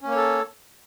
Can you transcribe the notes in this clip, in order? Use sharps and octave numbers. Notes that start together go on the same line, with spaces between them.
A#3 C#4 A4 C#5